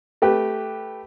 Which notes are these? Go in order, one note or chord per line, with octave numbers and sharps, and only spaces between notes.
A3 G4 B4